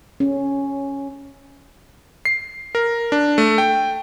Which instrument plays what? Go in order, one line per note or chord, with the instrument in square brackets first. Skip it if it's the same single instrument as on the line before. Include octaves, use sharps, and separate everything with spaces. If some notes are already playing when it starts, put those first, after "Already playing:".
[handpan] C#4
[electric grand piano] C7
A#4
D4
A3
G5